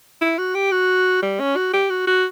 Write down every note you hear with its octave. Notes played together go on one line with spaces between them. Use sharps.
E4
F#4
G4
F#4
G3
C#4
F#4
G4
F#4
F#4